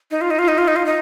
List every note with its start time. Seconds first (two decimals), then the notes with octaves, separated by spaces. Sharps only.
0.11 D#4
0.21 F4
0.31 D#4
0.39 F4
0.48 D#4
0.58 F4
0.68 D#4
0.76 F4
0.86 D#4